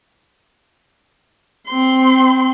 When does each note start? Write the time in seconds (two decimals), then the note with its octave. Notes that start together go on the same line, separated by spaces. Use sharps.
1.67 C4 C6